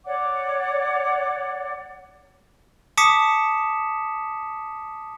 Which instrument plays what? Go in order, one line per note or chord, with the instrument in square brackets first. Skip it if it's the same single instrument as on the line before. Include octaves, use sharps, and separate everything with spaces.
[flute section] C#5 D5 F#5 D6
[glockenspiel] A5 D6 D#6 B6 C#7 E7